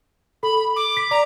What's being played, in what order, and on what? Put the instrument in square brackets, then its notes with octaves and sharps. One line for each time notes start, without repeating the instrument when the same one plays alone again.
[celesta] A4 [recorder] B5
[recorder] D6
[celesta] B6
[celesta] D5 [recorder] A#5